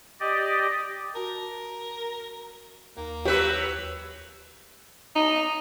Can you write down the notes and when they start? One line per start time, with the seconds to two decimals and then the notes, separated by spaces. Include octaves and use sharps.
0.20 G4 D5 D#5
1.15 F#4 A#4 A5
2.97 D#2 A#3
3.25 F#3 G4 B4 E6
5.15 D#4